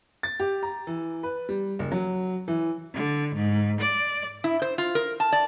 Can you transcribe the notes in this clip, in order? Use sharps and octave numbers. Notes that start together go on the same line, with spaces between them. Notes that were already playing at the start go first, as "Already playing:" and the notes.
A6
G4
A#5
E3
B4
G3
F#1
F#3
E3
D3
G#2
D5
E4
C5
F4
A#4
A5
D5